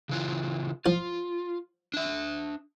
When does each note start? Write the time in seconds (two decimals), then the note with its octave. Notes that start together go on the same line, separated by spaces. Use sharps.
0.09 C#3 E3 F4
0.86 F3 F4
1.94 D4 E5